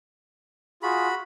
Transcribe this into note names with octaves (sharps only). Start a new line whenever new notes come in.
F4 F#4 G#4 B5